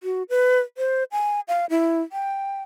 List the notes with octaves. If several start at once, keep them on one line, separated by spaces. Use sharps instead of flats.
F#4
B4
C5
G#5
F5
E4
G5